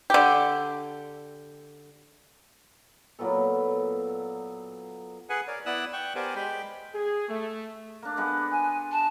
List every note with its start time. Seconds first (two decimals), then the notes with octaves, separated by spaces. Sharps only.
0.10 D3 G4
3.19 A#2 F#3 B3 A4
5.29 G#4 B4 F#5 G#5
5.47 A#4 C#5 D5
5.66 B3 E4 D5 D#6 E6 F#6
5.93 G5 C#6 F#6
6.15 B3 G4 A#4 C5 D5 G#5
6.36 G#3 G4 G5 B5
6.95 G#4
7.29 A3
8.02 A#3 D4
8.17 G#3 B3 D4
8.51 G#5
8.92 A5